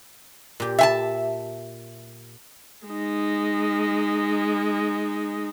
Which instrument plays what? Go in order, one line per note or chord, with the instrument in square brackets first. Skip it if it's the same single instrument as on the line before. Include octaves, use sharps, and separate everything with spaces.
[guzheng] A#2 G4
[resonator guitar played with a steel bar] E5 G#5 A5
[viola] G#3 D#4